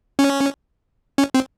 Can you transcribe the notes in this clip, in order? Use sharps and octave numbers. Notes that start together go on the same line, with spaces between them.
C#4
C#4
C4